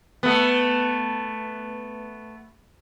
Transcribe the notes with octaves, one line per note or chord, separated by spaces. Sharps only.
A3 B3